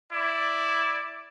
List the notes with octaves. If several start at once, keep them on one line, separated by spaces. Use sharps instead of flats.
E4 D5